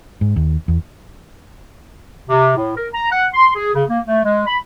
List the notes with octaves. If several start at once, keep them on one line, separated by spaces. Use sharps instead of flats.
G#2
D#2
E2
C3
A2
A#4
A#5
F#5
C6
G#4
C#3
A#3
A3
G#3
B5